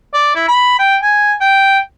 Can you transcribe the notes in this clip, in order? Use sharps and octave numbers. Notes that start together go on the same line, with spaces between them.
D5
E4
B5
G5
G#5
G5